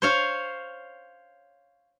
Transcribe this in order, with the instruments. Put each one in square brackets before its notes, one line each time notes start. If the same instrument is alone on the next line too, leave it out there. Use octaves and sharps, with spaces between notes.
[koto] C5 C#5 F5